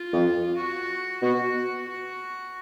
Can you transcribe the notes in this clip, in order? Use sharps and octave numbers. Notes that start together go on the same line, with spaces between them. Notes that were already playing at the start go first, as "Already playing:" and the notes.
Already playing: F4
F2
F#4
B2 F#4
F#4